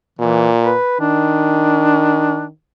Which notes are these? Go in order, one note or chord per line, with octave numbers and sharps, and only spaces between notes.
A#2 E3
B4
D#3 D4